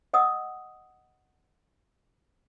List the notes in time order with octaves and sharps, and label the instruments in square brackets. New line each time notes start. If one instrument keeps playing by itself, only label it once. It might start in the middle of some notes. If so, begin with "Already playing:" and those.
[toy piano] D#5 F#5 D#6 E6